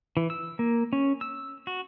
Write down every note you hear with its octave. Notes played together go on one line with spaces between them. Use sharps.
E3
E6
A#3
C#4
E6
F#4